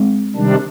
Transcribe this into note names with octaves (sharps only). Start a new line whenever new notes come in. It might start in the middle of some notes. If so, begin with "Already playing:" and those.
Already playing: G#3 C4
C3 D#3 G3 D4